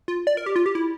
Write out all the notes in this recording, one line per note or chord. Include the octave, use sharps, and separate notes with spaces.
F4
D5
A#4
G4
F4
G4
E4